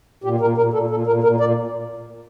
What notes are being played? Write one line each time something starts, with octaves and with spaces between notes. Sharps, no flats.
A#2 G4
A#2 A#4
A#2 A#4
A#2 A4
A#2 A4
A#2 A#4
A#2 A#4
A#2 D5